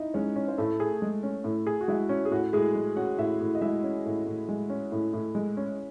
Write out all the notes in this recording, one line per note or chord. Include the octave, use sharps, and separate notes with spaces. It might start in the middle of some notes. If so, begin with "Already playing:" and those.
Already playing: D#4 E4 D#5 E5
G#3 C#4 C#5
C#4
C5
A2 A3 A4
G#4
G#3
C#4
A2
G#4
F#4
G#3 E4
C#4
G#4
A2 F#4
A2 G#3 G#4
G#3
C#4 F#4 F#5
A2 E4 E5
A2
D#5
G#3 E4 E5
C#4
A2
A2
G#3
C#4
A2
A2
G#3
C#4